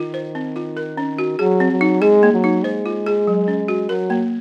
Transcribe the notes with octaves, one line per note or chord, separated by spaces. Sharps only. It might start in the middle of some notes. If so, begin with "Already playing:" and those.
Already playing: D#3 F4
C5
C4
F4
A#4
C#4
F#4
F#3 G#4
C4
F#3
D#4
G#3 G#4
A#3
F#3
D#4
G#3 C5
F4
G#4
F#3
C#4
F#4
F#3 A#4
A#3